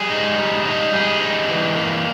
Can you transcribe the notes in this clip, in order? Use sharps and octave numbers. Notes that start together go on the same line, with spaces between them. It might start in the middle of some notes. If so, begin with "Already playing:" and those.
Already playing: G3 G#4
D#4
G3
D#4
G3 G#4
D#4
E3
A#3